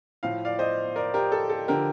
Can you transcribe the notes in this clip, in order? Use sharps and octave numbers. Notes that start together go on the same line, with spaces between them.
A2 F3 F5
D5 F5
C5 D#5
A#4 D5
G4 A#4
A4
A4
D3 F3 G4 A#4